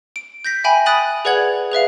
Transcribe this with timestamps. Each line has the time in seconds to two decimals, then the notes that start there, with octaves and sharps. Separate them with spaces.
0.16 D7
0.45 G6 A#6 B6
0.64 E5 G5 G#5 B5
0.86 B5 D#6 F#6 A6 D#7 F#7
1.25 G#4 B4 D5 F#5 G#6 F#7
1.72 G#4 B4 E5 F5